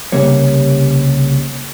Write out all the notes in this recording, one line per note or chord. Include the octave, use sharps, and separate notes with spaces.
C2 C#3 G3 A#3 C#5